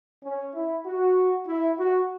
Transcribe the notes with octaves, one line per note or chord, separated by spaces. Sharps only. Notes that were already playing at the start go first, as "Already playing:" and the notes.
C#4
E4
F#4
E4
F#4